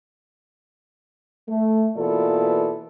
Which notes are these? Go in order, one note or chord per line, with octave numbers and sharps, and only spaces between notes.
A3
B2 E3 A#3 F4 A4 D5